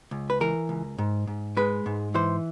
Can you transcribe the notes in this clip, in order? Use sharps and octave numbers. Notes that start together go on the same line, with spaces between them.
C#2
B4
E3 A#4
C#2
G#2
G#2
G#3 B4
G#2
E3 C5